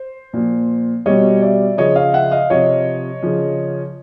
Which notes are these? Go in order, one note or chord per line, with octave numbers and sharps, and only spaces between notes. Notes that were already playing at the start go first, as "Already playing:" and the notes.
Already playing: C5
A#2 F3
B2 G3 C#5 D#5
D5 E5
C#3 F3 C#5 D#5
D#5 F5
E5 F#5
D#5 F5
C3 F3 C#5 D#5
C#3 F3